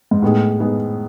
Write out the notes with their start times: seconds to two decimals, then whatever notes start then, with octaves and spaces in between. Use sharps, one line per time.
0.11 G#2
0.22 A2 G#3 B3 D#4 G#4
0.60 G#3 B3 D#4 G#4